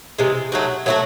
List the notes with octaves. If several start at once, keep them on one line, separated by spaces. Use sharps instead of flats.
C3 E3 G#3
F#3 A3 D#4 F#4
F#3 A3 D#4 F#4